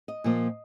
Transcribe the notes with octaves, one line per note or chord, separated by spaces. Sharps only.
D#5
A#2 F3 A#3